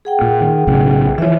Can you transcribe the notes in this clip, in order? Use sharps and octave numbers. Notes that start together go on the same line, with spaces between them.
G#4 F#5 G5
A#2
D#3
B1 A2 C#3
E3 F3 C#5 E5